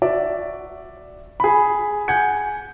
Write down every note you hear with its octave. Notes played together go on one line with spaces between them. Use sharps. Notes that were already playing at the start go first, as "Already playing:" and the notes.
F#4 D5 E5
G#4 B5
F#5 G#5 G6 G#6 C#7